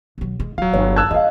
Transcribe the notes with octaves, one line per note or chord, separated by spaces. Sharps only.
B1 F#3
G#3
D1 F#3 F4 F5
G1 C#5
A5 E6 F#6 G#6
F4 D#5 F5